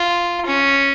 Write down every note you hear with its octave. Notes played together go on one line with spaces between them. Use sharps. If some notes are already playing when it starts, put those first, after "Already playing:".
Already playing: F4
C#4